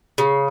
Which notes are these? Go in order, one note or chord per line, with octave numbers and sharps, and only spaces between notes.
C#3